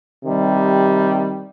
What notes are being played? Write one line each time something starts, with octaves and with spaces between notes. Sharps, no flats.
C3 D#3 G3